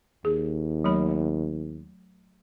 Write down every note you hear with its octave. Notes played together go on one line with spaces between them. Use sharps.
D#2 G#4
F#3 A3 B5